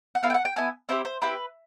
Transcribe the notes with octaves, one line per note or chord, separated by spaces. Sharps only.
F#5
B3 E4 A4 F5
G5
F#5
G5
B3 E4 A4 G#5
C4 E4 G4 C5
C5
C4 E4 G4 B4